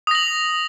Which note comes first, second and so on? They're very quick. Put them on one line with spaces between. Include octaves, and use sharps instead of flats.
D#6 A#6 F#7